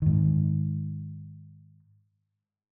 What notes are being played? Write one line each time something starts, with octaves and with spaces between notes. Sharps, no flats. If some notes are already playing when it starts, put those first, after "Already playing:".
G#2 D#3